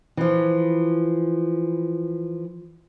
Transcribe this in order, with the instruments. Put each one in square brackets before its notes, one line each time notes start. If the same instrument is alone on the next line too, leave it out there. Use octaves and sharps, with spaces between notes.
[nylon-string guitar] E3 F3